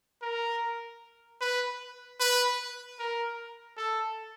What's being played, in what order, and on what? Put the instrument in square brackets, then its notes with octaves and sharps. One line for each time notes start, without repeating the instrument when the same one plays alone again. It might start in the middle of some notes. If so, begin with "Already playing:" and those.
[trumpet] A#4
B4
B4
A#4
A4